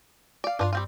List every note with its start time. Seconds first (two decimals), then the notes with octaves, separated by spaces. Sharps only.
0.44 D5 F5
0.59 G2 D4 F4 F5
0.73 G3 C4 F4